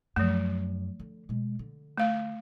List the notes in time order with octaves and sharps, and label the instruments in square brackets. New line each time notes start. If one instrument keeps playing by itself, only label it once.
[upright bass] F#2 [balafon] F3 A3
[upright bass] D3
B2 G#3
D3
[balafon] A3 F5